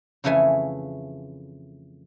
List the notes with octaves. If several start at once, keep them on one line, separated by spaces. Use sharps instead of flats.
F2 C#3 E3 A3 G#5